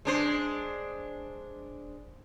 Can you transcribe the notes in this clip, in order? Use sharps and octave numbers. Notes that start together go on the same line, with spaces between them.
G#3 D4 C5